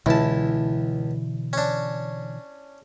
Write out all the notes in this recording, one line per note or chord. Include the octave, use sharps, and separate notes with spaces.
C#2 B2 D3 E3 E4 A5
C#4 D4